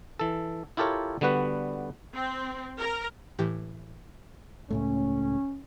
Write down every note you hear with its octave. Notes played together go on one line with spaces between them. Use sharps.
E3 A4
E4 F4 G4 A4 A#4 C#5
D3 G3 B3 F#4 B4
C4
A#4
A2 E3 G4
C#2 A2 A3 C#4